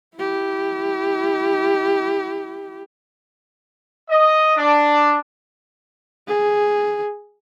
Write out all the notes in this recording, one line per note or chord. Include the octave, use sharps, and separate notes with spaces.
E4 G4
D#5
D4
G#4